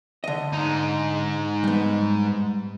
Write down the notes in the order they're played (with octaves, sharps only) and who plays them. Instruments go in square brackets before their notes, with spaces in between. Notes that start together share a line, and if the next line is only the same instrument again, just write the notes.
[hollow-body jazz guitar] D3 D#5
[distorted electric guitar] G#2 D#4
[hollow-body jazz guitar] G3 B3